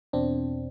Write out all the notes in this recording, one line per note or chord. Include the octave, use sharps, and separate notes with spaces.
E2 B2 C4 D4